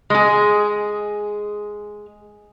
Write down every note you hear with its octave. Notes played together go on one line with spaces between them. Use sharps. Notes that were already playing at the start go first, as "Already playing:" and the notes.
G#3 G#4